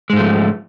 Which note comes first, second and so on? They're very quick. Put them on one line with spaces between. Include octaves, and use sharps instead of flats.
G#3 G#2 A3 F3